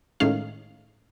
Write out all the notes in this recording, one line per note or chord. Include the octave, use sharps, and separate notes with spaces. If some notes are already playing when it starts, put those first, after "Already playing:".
A2 D#3 G#3 C#4 F5